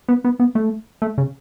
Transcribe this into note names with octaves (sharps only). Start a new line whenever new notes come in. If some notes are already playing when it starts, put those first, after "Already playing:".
B3
B3
B3
A3
A3
C#3